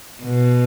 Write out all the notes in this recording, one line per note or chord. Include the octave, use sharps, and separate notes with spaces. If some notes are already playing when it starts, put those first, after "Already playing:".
B2